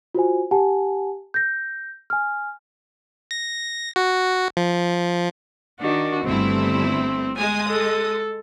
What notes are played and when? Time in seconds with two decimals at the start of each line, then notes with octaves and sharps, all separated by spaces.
0.14 F4 F#4 C5 G#5
0.51 G4 F#5 G#5 A5
1.34 G6 A#6
2.10 G#5 F6
3.31 A#6
3.96 F#4
4.57 F3
5.81 D#3 D4 F#4
6.24 G1 A3 C4 E4
7.38 G#3 G#5 D#6
7.69 A4